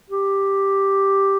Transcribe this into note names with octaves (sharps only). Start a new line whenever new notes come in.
G4